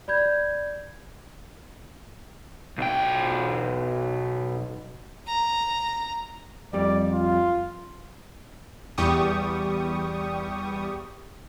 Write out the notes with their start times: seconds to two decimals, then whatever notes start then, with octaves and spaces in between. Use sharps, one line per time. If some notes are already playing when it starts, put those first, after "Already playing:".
0.08 D5 B5 G6 G#6
2.78 B1 G5
5.27 A#5
6.73 F2 G3 D5
7.11 F4
8.98 E2 G3 G4 C#6 D#6